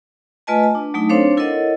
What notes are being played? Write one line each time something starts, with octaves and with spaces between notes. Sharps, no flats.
A3 F4 B4 D#5 G#5 A5
A5
D4
F#3 A3 D#4
C4 D4 A4 C5 C#5 F5
E4 A4 A#4 C#5 D#5 F#5